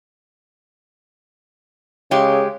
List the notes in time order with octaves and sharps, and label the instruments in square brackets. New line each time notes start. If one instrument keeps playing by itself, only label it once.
[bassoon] C#3 [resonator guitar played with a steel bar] G#3 G4